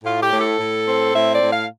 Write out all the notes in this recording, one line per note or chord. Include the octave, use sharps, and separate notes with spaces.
A2 F4
G4
A2
A4
A2
C4
A2 E5
D5
A2
F5